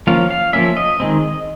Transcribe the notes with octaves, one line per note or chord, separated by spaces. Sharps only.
F3 A#3 C#4 F5
F5
F3 A#3 C#4 E5
D#5
D#3 G#3 C4